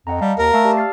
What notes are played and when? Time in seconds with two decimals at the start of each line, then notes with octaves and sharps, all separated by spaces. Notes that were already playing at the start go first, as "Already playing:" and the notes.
0.07 F2 D#5 F#5 A#5
0.21 G3 F5 F#5 A5
0.39 D#2 A#4
0.53 A3 F5 A5 E6
0.65 G4 D5 A5
0.77 F6 A6 C7